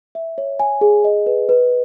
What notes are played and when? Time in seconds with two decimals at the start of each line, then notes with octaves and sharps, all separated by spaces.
0.15 E5
0.38 C#5
0.60 G#5
0.81 G#4
1.04 D#5
1.26 B4
1.49 B4